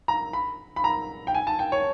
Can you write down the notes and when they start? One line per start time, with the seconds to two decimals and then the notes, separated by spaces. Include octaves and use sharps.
0.08 A#5
0.33 B5
0.76 B5
0.84 A#5
1.27 G5
1.35 G#5
1.47 A5
1.59 G5
1.72 C#5